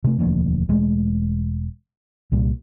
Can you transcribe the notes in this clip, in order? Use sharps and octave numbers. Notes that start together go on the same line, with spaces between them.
C3 A3
E1 D2 F3 A#3
E1 G#3 A3
C2 A#2 G3